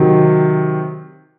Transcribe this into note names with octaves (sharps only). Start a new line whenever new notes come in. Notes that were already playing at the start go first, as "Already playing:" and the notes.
Already playing: C3 D#3 F#3